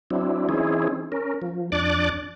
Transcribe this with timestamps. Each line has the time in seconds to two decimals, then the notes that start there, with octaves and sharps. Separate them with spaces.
0.11 F#3 C4 D4 E4
0.49 E3 C4 C#4 D#4 E4 G#4
1.12 C#4 A#4
1.42 F3
1.72 F2 D4 D5 D6 F#6 A6